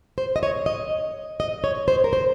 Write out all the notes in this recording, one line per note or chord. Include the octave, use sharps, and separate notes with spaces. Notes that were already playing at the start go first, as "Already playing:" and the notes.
C5
D#5
C#5
D#5
D#5
C#5
C5
A#4
C5